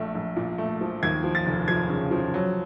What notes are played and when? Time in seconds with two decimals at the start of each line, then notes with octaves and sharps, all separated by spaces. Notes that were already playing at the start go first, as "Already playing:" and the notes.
Already playing: A#1 A3
0.15 A#1
0.36 A#2
0.58 A3
0.81 F3
1.03 D#2 G#6
1.24 F3
1.35 A6
1.46 F1
1.68 F3 G#6
1.89 C#3
2.11 F3
2.34 F#3